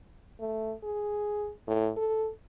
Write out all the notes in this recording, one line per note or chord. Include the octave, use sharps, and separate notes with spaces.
A3
G#4
A2
A4